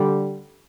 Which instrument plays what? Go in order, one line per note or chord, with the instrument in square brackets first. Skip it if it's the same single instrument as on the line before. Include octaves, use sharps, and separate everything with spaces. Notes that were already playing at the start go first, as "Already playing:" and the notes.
Already playing: [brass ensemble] D3 G3